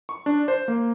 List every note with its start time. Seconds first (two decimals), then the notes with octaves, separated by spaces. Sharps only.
0.09 C#6
0.26 D4
0.48 C5
0.68 A#3